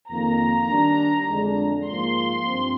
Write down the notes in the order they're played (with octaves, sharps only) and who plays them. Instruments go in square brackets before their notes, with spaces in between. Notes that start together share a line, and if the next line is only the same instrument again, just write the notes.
[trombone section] F2 D#3 A#3 [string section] A#5
[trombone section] D#3 G3 D4
F2 D3 G#3 D4
[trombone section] G#2 F3 A#3 [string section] C6
[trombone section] G2 F3 C4